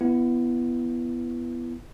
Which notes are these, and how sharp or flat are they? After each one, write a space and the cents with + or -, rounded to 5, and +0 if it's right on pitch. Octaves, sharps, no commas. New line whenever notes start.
B3 +0 E4 +30